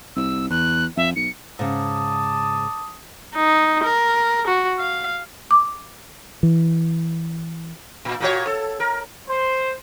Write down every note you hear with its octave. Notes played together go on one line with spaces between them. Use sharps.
C2 E6
E2 F#6
F2 E5
B1 C#7
G#2 C#3 A5 D6 D#6
D#4
A#4
F#4
F5
D6
E3
A#2
A#2 F#4 C#5
A4
A#4
C5